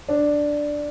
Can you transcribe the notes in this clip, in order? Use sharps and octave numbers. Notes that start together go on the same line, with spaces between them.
D4